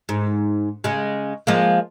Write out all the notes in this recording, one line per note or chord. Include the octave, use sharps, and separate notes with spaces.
G#2
C#3 G#3
F3 G#3 A#3